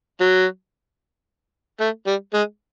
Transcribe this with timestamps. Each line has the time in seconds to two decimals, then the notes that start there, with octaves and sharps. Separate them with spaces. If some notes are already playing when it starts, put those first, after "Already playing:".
0.20 F#3
1.80 A3
2.06 G3
2.34 G#3